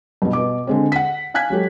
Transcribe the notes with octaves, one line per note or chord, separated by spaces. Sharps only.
G2 B2
B2 D6
D3 G#3 C4
F#5 B6
F5 G#5 F#6 G#6 B6
F#3 G#3 G4 A4